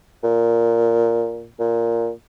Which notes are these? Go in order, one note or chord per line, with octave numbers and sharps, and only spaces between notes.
A#2
A#2